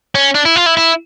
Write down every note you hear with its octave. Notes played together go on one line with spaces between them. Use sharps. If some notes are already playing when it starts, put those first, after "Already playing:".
C#4
D4
E4
F4
E4
E4